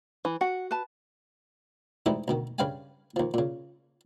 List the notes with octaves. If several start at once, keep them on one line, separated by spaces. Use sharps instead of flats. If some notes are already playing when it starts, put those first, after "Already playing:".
E3
F#4 F#5
B4 A5
G#2 E3 G3 A3 D#4 E4
D2 B2 D#3
G2 C#3 B4 F5 G5 G#5
D#2 F3
A#2 C#3